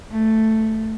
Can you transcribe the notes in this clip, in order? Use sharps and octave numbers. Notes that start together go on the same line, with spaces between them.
A3